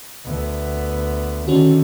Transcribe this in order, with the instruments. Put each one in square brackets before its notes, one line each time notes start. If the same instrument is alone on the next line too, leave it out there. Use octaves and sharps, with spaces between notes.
[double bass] D2 B3
[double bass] D3 D#3 [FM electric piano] C#4 F#4